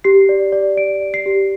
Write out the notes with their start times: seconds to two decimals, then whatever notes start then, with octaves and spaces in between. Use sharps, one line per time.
0.04 G4 C7
0.29 D5
0.52 D5
0.77 D5 D7
1.02 D5
1.14 C7
1.26 G4